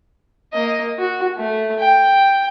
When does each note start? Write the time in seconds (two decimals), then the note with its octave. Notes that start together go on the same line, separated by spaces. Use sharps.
0.53 A#3 D#5
0.98 F#4
1.37 A3
1.80 G5